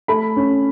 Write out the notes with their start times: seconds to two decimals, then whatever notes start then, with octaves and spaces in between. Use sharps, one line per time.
0.08 A3 B5
0.37 C#4